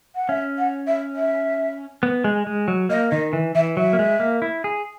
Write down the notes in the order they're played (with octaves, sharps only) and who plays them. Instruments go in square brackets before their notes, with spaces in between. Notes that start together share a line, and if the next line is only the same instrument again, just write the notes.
[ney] F#5
[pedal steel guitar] C#4 [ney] E5
[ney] F#5
E5
E5
[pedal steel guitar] B3
G#3
G#3
F#3
[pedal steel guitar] A#3 [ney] D#5
[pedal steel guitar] D#3 [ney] D#5
[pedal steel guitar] E3
[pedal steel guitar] E3 [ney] E5
[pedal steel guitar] F#3 [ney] E5
[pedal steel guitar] A#3
G#3
A#3
E4
G#4